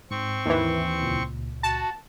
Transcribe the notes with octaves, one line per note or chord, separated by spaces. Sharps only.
G#2 C4 C#6
D#2 E3
C#2 A#2
F#4 A5